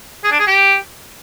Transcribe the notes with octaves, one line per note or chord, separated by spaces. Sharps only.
G#4
D4
G#4
G4